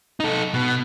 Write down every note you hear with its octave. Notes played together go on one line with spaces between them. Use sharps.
D#4 A4
B2